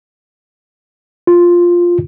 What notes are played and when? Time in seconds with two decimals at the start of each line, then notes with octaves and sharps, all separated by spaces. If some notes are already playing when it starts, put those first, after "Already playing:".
1.27 F4